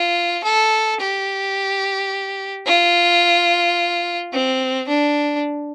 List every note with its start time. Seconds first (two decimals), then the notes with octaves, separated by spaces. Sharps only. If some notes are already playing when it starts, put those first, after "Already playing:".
Already playing: F4
0.44 A4
1.00 G4
2.67 F4
4.33 C4
4.88 D4